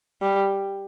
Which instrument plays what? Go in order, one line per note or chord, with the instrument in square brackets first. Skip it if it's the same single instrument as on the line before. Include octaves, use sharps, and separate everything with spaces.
[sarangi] G3